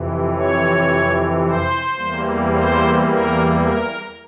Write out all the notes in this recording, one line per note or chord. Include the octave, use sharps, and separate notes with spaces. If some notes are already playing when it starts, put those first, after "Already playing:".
Already playing: F2 C3 E3
C#5
C5
E2 E3 G3 A#3
C5
A#4
A#4